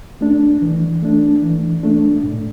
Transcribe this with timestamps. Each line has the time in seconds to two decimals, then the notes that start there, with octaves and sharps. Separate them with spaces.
0.21 A3 D4
0.62 E3
1.03 A3 D4
1.42 E3
1.83 A3 D4
2.24 A2